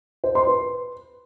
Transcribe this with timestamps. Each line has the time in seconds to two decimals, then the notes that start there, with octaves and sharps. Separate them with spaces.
0.24 C5
0.35 C6
0.47 B4